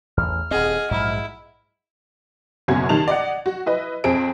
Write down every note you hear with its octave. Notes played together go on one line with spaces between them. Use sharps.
A1 E2 F6
D#1 C4 G#4 D#5 F#5
A#1 G#2 F#3 E4
F#1 F#2 B2 C#4 F#4 G#6
D#3 G3 A5 F7
D5 D#5 F#5
F#4
E4 B4 D#5
F2 C4 G#4 D7